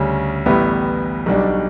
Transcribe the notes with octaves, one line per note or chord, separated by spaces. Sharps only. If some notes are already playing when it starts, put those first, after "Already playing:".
Already playing: D2 C#3 G3 C#4
A1 A2 G3 B3 E4
B1 B2 G3 D4